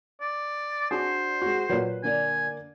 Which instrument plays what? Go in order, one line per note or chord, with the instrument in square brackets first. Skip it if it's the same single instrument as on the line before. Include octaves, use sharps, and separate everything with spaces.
[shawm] D5
[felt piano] D4 F#4 [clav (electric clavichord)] G#4 [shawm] C5
[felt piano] G#3 F#4
[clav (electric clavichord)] A#2 F#3 [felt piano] B4
[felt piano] D3 A#3 D5 [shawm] G#5